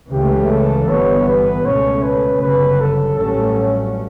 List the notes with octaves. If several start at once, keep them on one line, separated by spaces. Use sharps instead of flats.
C#2 C#3 E3 A3 G4
A4
G1 G2 E3 B3 C#5
B4
C#2 B2 A3 C#4 C#5
B4
G1 F#2 C#3 B4
A4
A1 G2 F#3 A3 C#4 A4